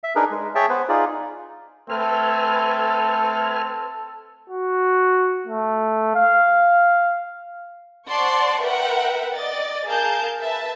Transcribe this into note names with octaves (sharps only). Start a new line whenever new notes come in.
E5
D4 D#4 G#4 A#4 B4
G#3
G#4 C#5 E5 G5 A5
B3 B4 C5
D#4 F4 G#4 D5
A3 C4 A4 B4 G#5 F6
F#4
A3
F5
C5 D5 F#5 A5 C6 C#6
A#4 B4 E5 F#5 G5
D5 D#5 A6
G#4 A#4 F5 A5 G6
B4 E5 A5